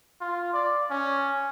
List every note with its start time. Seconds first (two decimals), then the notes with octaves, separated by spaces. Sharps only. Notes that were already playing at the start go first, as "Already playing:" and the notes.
0.21 F4
0.53 D5
0.90 C#4